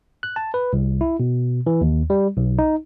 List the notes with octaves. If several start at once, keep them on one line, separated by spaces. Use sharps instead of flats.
F#6
A5
B4
C2
E4
B2
E3
D#2
G3
B1
D#4